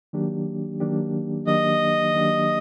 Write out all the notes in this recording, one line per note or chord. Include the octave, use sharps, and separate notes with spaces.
D#3 F#3 A#3 D4 G4
D#3 F#3 A#3 D4 G4
D#3 F#3 A#3 D4 G4 D#5
D#3 F#3 A#3 D4 G4